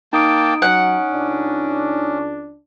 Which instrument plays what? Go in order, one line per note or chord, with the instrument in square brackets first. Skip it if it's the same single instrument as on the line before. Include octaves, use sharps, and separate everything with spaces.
[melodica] A#3 G5 A5 [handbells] D#4 D#6 D7
[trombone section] F#3 [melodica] C#4 [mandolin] F#5
[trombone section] C#2 D4